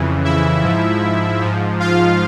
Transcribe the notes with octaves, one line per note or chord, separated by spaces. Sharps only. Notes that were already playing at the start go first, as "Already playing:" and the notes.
Already playing: F2 C#3 E3
E4 E5
G#2 F3
G#2 F3
F4 F5